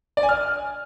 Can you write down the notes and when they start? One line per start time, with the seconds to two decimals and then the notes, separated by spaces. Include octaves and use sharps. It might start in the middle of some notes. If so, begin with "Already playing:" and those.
0.17 D5
0.23 G#5
0.29 F6